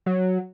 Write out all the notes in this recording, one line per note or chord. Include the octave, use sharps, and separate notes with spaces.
F#3